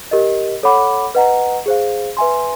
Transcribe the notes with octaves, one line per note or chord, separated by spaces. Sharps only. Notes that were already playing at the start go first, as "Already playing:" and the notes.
G4 A#4 D#5
A4 C#5 F#5 B5 D6
B4 D#5 F#5 A#5
G#4 C5 F5
B4 E5 G#5 C6